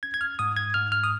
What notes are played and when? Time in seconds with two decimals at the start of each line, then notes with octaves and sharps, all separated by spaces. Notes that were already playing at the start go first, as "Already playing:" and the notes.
0.03 C#4 G#6
0.14 G#6
0.21 F6
0.39 G#2 D#6
0.57 G#6
0.74 G#2 F6
0.92 F6
1.04 D#6